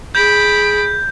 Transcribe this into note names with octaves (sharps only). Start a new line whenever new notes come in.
G#4 B5 G6 D7